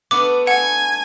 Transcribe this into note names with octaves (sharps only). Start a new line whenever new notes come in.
A3 B3 D4 D6
F#5 G#5